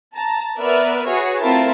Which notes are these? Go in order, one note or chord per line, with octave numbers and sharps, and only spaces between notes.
A5 A#5
B3 A#4 B4 D5 E5 F6
F#4 G#4 B4 C#5
A3 C4 E4 F4 A#4 A5